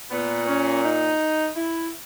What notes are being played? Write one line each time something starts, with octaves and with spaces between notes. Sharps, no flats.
A#2 B3
C#4
D#4
E4